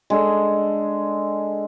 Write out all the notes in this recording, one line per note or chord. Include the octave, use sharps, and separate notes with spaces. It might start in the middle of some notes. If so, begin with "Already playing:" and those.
G#3 D4 A4